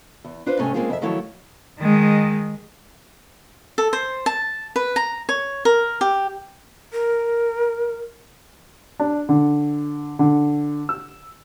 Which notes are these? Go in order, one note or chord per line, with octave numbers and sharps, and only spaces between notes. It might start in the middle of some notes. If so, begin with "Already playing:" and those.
E2
D4 F4 B4 C5
G#2 C3 A3 C#4 C#5 G#5
G#3 A#3 C4 C#4 F4 G#4
F2 E5
D#3 F3 F#3 A3 E4 C#5
D#3 G#3
A4
C5
A5
B4
A#5
C#5
A#4
G4
A#4
D4
D3
D3
E6